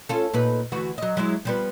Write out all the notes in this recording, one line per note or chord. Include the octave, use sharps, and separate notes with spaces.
C#4 F4 A4
A#2 D#4 B4
D2 E3 F#4
F#3 D#5
F#3 G#3 E4
F3 G3 B3